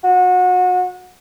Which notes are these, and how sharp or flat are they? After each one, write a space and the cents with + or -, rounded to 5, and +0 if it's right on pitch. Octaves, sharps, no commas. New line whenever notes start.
F#4 -30